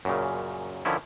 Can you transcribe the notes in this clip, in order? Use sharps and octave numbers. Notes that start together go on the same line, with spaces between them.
F#2 A#2 C#3
D3 D#3 F3 C#4 E4